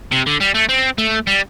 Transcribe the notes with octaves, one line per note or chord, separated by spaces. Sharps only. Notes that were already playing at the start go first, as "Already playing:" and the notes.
C3
D3
G3
A3
C4
A3
G3